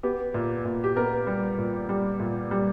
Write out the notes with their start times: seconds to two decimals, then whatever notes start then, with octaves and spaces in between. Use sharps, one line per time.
0.03 B3 G4
0.34 A#2
0.65 A#2
0.84 G4
0.96 B3 A#4
1.27 G3
1.58 A#2
1.89 G3
2.20 A#2
2.51 G3